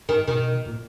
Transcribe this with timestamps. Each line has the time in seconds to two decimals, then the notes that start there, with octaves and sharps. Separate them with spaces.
0.09 D#3
0.28 B2 D#3
0.67 A#2